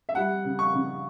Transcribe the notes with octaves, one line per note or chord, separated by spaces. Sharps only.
E5
G3 F#5
C#3
C#6
C#3